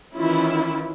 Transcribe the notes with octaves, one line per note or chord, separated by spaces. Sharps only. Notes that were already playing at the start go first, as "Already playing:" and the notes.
D#3 E3 C#4 E4 F4